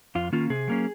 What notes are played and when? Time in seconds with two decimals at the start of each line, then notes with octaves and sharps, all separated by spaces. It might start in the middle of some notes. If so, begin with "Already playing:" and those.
0.15 F2 F4
0.33 D#3 A#3 C#4 F4
0.50 C3 G#4
0.68 F#3 A#3 C#4